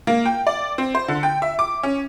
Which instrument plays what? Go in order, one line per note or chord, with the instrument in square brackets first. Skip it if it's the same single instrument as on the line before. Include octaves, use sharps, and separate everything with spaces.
[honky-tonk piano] A#3
G5
D5
C4
C5
D3
G5
E5
D6
C#4